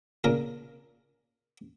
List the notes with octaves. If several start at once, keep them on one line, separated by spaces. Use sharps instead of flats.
A#2 C#3 F4 A#4